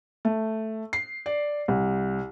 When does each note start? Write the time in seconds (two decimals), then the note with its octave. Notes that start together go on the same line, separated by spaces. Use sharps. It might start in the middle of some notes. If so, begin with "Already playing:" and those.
0.25 A3
0.93 C7
1.26 D5
1.68 C2